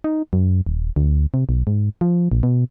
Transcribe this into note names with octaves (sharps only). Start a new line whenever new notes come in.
D#4
F#2
D#1
D2
C3
B1
G#2
F3
A#1
B2